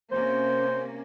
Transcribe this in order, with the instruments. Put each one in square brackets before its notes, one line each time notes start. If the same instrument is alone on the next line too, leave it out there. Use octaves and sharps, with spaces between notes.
[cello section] C3 A#3 C#4 [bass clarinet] C5